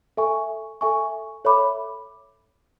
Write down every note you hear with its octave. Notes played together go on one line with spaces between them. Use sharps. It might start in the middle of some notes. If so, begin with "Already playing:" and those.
A4 E5 G#5 C#6
A4 E5 G#5 C#6
A4 C#5 E5 B5 D6